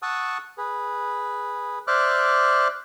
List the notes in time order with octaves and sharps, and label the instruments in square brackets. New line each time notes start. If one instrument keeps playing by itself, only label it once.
[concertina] F#5 A5 C#6 D#6 E6
G#4 B4
C5 D5 E5 D6 F6 F#6